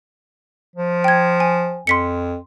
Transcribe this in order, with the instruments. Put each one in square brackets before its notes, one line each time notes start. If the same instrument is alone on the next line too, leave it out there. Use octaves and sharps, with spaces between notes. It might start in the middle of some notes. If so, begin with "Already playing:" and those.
[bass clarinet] F3
[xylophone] G5 G#6
G#5
[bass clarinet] F2 [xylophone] C6 B6 C#7